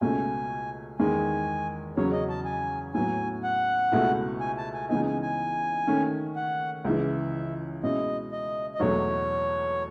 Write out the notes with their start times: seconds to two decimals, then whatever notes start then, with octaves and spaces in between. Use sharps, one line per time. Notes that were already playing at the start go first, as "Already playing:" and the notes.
0.01 C#2 B2 A3 C#4 G#5
0.99 E2 D#3 G#3 G#5
1.97 E2 C#3 F#3 C#4 C#5
2.12 D#5
2.29 A5
2.45 G#5
2.94 A2 F#3 B3 G#5
3.43 F#5
3.92 C#2 B2 A3 E4
4.40 G#5
4.57 A5
4.74 G#5
4.89 C#2 C#3 E3 B3 D#4 G#5
5.06 G#5
5.22 G#5
5.87 D#3 A3 C#4
6.36 F#5
6.85 C#2 C#3 E3 E5
7.83 B2 G#3 C#4 E4 D#5
8.32 D#5
8.75 D#5
8.80 E2 B2 F#3 A3 C#5